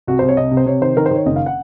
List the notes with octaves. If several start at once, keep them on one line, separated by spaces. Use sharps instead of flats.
C2 F#4
C2 C5
C#5
C2 D#5
C3
C5
C3 C#5
D#3 C5
D#3 A#4
C5
D#3 C#5
F#1 D#5
F5
F#5